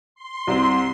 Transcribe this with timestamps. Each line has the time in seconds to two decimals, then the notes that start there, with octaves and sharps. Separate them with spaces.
0.15 C6
0.47 C2 C4